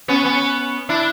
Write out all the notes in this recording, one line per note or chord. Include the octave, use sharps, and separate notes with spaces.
B3 C#4
B3 C#4
D4 E4